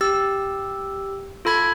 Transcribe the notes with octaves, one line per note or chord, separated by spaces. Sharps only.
G4 E6
F4 A4 B5 G#6